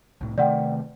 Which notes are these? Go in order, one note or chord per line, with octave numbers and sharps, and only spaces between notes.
C2 A2
C3 D#3 A3 D5 F#5 G5